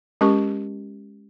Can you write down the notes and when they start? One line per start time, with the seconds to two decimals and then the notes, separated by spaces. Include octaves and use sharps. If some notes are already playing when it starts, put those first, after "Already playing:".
0.21 G#3 C#4 G4 A#4 C#6